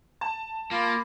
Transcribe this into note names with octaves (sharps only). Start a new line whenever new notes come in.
A5
A#3 F4 A#4 B5 D6